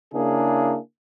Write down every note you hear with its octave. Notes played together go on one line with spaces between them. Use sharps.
C#3 A#3 D4 E4 G#4